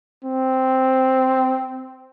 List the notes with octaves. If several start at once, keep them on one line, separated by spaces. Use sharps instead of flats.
C4